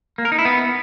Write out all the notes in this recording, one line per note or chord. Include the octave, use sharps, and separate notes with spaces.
A#3
A#4
D#4
E4
B3